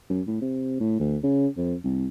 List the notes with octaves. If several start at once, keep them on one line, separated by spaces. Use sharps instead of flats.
F#2
A2
C3
A2
D2
C#3
F2
C2